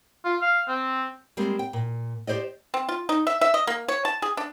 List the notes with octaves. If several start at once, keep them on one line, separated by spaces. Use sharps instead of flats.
F4
F5
C4
G3 G#3 A#3 C4
G5
A#2
G4 G#4 C5 D5 D#5
C4
F4
D#4
E5
E5
D#5
A#3
C#5
A5
G#4
D4